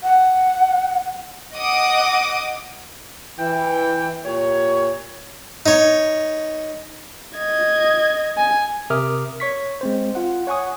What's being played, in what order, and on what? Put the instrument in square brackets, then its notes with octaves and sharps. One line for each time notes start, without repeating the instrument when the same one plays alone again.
[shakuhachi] F#5
[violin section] D#5 F#5 D6 D#6
[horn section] E3 G5
A#2 G4 C#5
[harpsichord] D#4 C#5
[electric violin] D#5 G#6
G#5
[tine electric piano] C3 A#4 E5 D6 D#6 F6
C#5 C#6 B6
G#3 C4 C5
F4 F#5
C#5 F#5 G#5 C#6 D#6